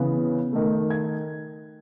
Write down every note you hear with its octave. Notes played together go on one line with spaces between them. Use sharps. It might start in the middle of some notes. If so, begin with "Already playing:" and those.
Already playing: C#3 E3 B3
D#3 A3
G#6